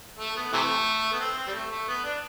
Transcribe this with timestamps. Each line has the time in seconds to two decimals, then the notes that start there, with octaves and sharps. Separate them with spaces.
0.19 A3
0.36 B3
0.53 C3 E3 A3
1.12 B3
1.20 C4
1.37 C4
1.47 G3
1.54 A3
1.71 A3
1.88 B3
2.05 D4